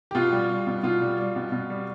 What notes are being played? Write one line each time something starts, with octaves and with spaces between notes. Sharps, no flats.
G4
B2 F4
G3
G3
B2
B2 F4
G3
G3
B2
B2
G3